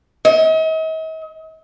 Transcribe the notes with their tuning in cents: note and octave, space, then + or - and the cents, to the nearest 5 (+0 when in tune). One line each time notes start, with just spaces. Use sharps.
D#5 +45